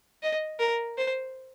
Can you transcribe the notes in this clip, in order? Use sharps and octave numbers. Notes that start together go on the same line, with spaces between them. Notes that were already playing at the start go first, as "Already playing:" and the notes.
D#5
A#4
C5